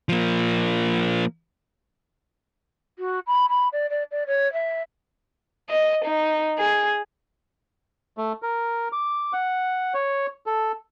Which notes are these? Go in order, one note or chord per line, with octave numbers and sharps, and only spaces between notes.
F3 A#3
F#4
B5
B5
D5
D5
D5
C#5
E5
D#5
D#4
G#4
A3
A#4
D6
F#5
C#5
A4